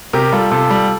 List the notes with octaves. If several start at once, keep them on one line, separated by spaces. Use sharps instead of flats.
C3 G4 A#4
G3 F4 A4
C3 F4 A4
G3